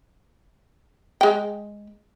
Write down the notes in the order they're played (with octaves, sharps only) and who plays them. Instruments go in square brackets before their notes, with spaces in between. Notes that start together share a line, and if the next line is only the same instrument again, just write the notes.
[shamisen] G#3 G5